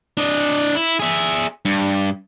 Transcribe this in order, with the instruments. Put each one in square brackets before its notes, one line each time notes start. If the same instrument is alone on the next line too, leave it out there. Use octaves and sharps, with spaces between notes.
[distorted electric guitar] D4 D#5
E4
G#4 E5
G2